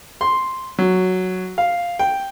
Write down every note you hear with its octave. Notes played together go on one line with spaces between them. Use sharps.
C6
F#3
F5
G5